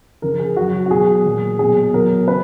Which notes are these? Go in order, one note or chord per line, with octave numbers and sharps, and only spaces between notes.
C#3 F3 A#4
G#4
C#3 F#3 F#4
F#4
B2 F#3 G#4
A#2 F#3
B2 F#3 G#4
B2 F#3 A#4
C#3 B4